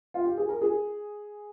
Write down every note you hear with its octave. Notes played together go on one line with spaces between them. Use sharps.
F4
G4
G#4
A#4
G#4